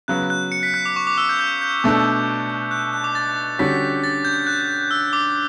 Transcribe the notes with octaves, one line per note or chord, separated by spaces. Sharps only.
C#3 F#3 B3 F#6
F#6
C#7
B6
F#6
D6
C#6
D6
E6
G6
G6
G6
B2 A3 D4 A4
F#6
F#6
D6
A6
D3 G3 C#4 F#4 B6
A6
G6
F#6
E6
D6